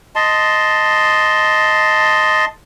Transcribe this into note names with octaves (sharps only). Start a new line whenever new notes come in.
D#5 A5 C6